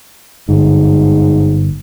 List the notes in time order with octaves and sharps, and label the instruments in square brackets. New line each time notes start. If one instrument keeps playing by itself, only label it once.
[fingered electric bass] G1 [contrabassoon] G#2